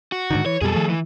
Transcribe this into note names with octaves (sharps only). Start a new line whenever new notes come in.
F#4
G#2 D3 D#3
E3 C#5
F2 B2 G3 G#4 A4
D#3 F3 A3
E3